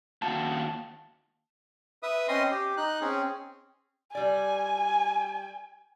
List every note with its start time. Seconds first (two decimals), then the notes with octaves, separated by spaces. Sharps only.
0.22 D#2 F#4 A5
2.03 B4 E5 D#6
2.28 C4 C#4 D#5 C6 D#6
2.51 G4
2.77 D#4 F#6
3.01 C4 C#4 G#4
4.15 G3 D5 G#5